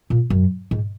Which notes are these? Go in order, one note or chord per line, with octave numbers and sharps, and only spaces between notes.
A#2
F#2
G#2